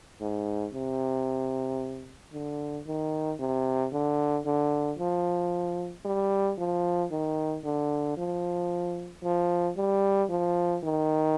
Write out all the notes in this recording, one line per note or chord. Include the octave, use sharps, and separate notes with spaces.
G#2
C3
D3
D#3
C3
D3
D3
F3
G3
F3
D#3
D3
F3
F3
G3
F3
D#3